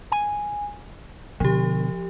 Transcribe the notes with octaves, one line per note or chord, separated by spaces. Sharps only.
G#5
B2 D3 F3 G4